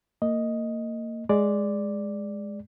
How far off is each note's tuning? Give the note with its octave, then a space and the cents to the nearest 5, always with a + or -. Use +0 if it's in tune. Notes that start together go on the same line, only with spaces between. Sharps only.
A#3 -25 D#5 +0
G#3 +0 D5 +0